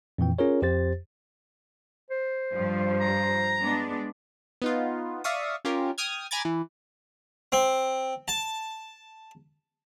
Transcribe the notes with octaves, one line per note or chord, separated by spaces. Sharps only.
F2 A#2 E3 G5
C#4 F4 G#4 A#4 C#5
F2 G4 C5 A6
C5
G2 F3 G3
A#5
G#3 B3 D4
B3 D#4 F4
D5 E5 F5 C#6 D#6
C#4 F4 G4 A#4
G5 D#6 F6 G#6
G#5 A#5 B5 D6 G#6 A6
E3
C4
A5